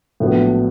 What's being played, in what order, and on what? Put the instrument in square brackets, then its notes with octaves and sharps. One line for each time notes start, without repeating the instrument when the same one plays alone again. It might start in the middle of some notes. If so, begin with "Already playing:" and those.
[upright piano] A#1 A2 F#3 B3